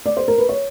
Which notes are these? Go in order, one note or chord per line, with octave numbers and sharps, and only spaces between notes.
D5
C5
A#4
B4
C#5